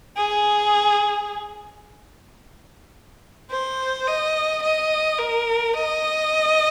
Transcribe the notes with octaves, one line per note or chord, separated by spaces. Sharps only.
G#4
C5
D#5
D#5
A#4
D#5